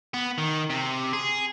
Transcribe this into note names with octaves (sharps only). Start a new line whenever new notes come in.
B3
D#3
C3
G#4